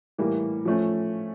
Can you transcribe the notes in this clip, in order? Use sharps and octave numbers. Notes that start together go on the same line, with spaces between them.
A2 E3 G3 A#3
F3 A3 C#4